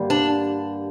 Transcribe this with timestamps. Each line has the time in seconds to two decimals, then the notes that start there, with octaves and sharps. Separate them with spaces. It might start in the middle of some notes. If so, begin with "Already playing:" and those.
Already playing: G2 D3 G3 A#3
0.10 D4